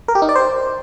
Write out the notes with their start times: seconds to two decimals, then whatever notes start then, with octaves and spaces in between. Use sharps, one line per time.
0.08 A#4
0.15 G4
0.22 D#4
0.29 D5
0.35 C5